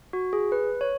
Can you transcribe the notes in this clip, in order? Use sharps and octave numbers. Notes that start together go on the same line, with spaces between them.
F#4
G#4
B4
C#5